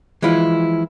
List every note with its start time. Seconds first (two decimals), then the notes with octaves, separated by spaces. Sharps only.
0.22 E3 F3 G#3 E4 F4